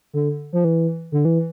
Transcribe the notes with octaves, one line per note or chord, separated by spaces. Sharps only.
D3
F3
E3
D3
E3